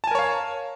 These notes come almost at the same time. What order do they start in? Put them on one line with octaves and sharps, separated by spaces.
A5 G#5 A#4 C#5 F5